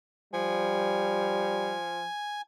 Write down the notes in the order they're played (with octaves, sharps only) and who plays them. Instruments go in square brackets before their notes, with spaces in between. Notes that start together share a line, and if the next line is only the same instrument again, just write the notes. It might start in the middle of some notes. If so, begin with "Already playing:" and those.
[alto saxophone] F3 [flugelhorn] G3 [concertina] G#5